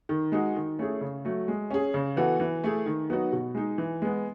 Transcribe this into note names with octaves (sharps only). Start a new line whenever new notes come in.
D#3
G#3 D#4 F#4
D#3
A3 C#4 E4 G#4
C#3
F#3 A3
G#3
C#4 G#4
C#3
E3 B3 F#4 A4
E3
A3 E4 G#4
D#3
F#3 B3 D#4 F#4
B2
G#3 D#4
E3
G#3 B3